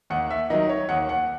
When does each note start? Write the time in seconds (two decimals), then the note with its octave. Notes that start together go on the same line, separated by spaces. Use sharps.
0.10 D#2 F#5
0.30 E5
0.50 D#3 F#3 D#5
0.69 C#5
0.89 D#2 F#5
1.09 F#5